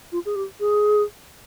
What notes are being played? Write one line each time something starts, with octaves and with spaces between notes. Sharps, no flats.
F4
G#4
G4
G#4